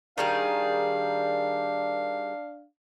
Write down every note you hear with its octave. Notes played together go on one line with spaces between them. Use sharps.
D#3 G3 D4 G#4 F5